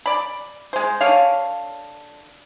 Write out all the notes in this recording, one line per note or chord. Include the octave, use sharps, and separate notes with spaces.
D5 B5
G#3 C5
D3 C#5 F5